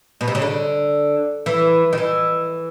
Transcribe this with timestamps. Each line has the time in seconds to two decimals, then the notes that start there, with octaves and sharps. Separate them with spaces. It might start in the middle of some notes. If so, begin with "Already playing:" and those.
0.21 B2
0.28 C3
0.35 C#3
0.42 D3
1.46 E3
1.93 D#3
1.98 E3